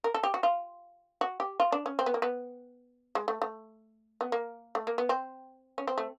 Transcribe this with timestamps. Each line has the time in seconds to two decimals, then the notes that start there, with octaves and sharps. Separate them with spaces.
0.04 A#4
0.14 A4
0.23 G4
0.34 F#4
0.43 F4
1.21 F#4
1.40 G4
1.60 F4
1.72 D4
1.86 C#4
1.99 C4
2.06 B3
2.14 A#3
2.22 B3
3.15 G#3
3.28 A3
3.42 A3
4.21 B3
4.32 A#3
4.75 A3
4.87 A#3
4.98 B3
5.09 C4
5.78 C#4
5.87 C4
5.98 A3